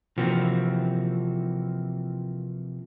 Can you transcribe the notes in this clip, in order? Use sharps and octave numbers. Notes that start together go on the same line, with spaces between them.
C3 E3 F3 A#3 C4 F#4